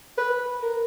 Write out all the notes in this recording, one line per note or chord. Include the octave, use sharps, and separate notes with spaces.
B4
A#4